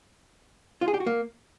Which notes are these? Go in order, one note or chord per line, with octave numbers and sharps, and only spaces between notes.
F4
G#4
G4
F#4
A#3